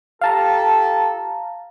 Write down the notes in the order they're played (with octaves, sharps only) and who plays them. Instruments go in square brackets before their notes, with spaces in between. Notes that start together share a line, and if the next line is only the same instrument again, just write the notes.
[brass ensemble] F4 G4 A4 [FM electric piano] F5 A5 A#5